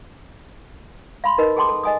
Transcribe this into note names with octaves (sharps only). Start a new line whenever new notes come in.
F5 B5 C6
D#4 A#4 B4 D#5
G#4 A4 G5 A5 C6 D6
A4
D#5 G#5 D#6